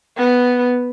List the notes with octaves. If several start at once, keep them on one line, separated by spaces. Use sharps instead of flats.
B3